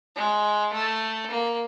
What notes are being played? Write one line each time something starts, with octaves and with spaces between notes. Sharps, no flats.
G#3
A3
A#3